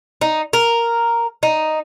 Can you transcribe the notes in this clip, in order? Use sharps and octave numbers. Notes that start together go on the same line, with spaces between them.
D#4
A#4
D#4